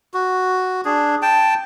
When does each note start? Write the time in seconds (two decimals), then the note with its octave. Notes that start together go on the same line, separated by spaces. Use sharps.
0.14 F#4
0.85 D4 G#4
1.22 G5 A5